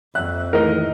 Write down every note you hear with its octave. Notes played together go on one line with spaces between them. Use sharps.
F2 E5 F#6
A2 D#3 E3 A#4 D#5